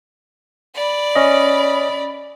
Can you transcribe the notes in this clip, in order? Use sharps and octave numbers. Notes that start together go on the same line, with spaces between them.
D5 B5
C#4 D#5